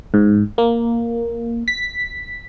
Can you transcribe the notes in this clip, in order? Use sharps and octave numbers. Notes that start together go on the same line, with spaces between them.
G#2
A#3
B6